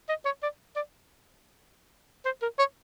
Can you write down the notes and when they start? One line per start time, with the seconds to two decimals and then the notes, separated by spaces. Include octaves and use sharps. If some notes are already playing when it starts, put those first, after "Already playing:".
0.09 D#5
0.25 C#5
0.43 D5
0.76 D5
2.25 C5
2.42 A#4
2.59 C#5